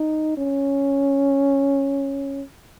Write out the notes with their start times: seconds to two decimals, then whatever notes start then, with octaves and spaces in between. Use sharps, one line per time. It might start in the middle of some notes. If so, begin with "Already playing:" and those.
Already playing: D#4
0.37 C#4